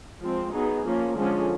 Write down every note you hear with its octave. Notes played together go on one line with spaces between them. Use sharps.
F3 G#3 C4
F#3 B3 D#4 G#4
F3 A#3 C#4
D3 F3 G#3 C#4